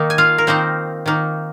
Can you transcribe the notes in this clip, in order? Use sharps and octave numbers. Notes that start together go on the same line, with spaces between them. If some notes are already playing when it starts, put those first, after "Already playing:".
Already playing: D#3 A#3 D#4
G#5
F4 F5
A#4
D#3 A#3 C4 D#4 C5
D#3 A#3 D#4